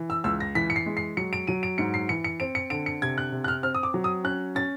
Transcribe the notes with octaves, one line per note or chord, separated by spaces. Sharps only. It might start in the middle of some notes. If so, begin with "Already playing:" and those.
Already playing: E3
E6
C#2 E6
A#6
E3 B6
C#7
C7
G#3
C7
F#3 C#7
D7
F#3 D#7
D7
G#2 C#7
C7
E3 C#7
C#7
C4 D7
C#7
D3 D7
C#7
C3 G#6
F#6
C3
F#6
F6
C4 F6
D#6
D6
F#3
D#6
C#4 F#6
C#4 A6